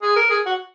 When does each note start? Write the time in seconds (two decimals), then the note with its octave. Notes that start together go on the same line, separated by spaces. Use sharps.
0.02 G#4
0.16 A#4
0.30 G#4
0.46 F#4